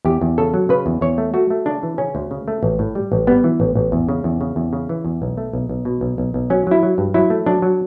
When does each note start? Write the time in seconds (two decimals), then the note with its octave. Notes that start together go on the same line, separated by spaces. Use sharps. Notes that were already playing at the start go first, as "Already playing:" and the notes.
0.05 E2 G4
0.21 E2
0.38 C#3 A4
0.54 F#3
0.69 C#3 B4
0.86 E2
1.01 E2 C#5
1.18 A3
1.34 A3 F#4
1.50 A3
1.66 C#3 D4
1.83 E3
1.98 C#3 C#4
2.15 D2
2.31 C#3
2.48 A3
2.63 A1
2.79 A2
2.95 G3
3.12 A1
3.27 G3 B3
3.44 E3
3.60 A1
3.75 A1
3.92 E2
4.09 C#3
4.24 E2
4.41 C#3
4.56 E2
4.73 C#3
4.89 E3
5.05 E2
5.22 B1
5.37 A3
5.53 B1
5.69 B1
5.85 B2
6.01 B1
6.18 B1
6.34 B1
6.50 F#3 C#4
6.67 F#3 E4
6.83 F#3
6.98 G2
7.14 F#3 E4
7.30 A3
7.46 F#3 D4
7.62 F#3